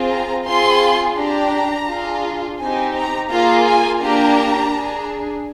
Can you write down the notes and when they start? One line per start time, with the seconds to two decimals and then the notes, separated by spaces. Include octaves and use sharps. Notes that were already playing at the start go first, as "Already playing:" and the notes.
Already playing: C4 F4 G#4
0.11 A#5
0.46 C4 F4 G#4 C6
1.17 D4 G4 A#5
1.89 D4 F4 G#4
2.60 C4 D#4 G4 G#5
2.95 A#5
3.31 A#3 F4 G#4 A#5
3.66 G#5
4.01 A#3 D4 G4 A#5
4.73 D4 G#4